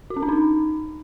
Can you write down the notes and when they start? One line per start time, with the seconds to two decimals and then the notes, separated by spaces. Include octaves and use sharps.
0.10 F#4
0.16 C#4
0.23 D4
0.29 D#4